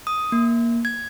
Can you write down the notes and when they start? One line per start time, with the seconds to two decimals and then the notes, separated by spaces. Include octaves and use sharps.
0.07 D#6
0.32 A#3
0.85 G#6